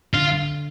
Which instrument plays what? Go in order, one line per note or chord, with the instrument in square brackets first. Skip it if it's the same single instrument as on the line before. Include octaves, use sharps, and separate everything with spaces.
[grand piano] D3 [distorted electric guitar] F4